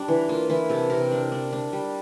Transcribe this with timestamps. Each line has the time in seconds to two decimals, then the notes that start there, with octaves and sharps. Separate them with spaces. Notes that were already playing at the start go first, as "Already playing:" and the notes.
Already playing: G3 D4
0.08 E3
0.29 A#3 F4
0.49 E3 E4
0.69 C3 A4
0.90 C3 A#4
1.11 D4
1.32 D4
1.53 D4
1.73 G3